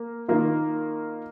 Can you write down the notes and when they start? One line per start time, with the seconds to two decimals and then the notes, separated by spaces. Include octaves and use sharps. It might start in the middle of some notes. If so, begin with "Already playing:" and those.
Already playing: A#3
0.28 D#3 A#3 F4